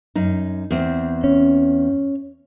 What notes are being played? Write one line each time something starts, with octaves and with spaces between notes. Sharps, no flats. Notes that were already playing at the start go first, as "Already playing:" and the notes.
F#2 D#4
E2 C4
C#4